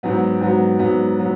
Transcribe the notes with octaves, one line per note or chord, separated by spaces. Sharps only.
G#2 F#3 B3
G#2 F#3 B3
G#2 F#3 B3
F#3 B3